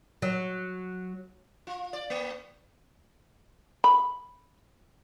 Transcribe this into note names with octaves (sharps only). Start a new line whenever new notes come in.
F#3
F4
D5
A#3
B5